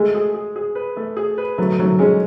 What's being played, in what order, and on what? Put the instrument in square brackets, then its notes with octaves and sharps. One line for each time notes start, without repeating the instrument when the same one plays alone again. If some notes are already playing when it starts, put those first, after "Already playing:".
Already playing: [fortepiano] G#3 [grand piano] A3
[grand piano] G#4
G#4
G#4
B4
A3
G#4
B4
[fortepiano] F#3 [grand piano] A3
[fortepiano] F#3 [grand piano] A3
[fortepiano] G#3 [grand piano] C#4